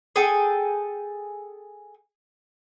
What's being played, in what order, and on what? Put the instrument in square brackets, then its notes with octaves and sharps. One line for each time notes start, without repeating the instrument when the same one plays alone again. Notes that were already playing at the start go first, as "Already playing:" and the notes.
[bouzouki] G#4 A4 G5 G#5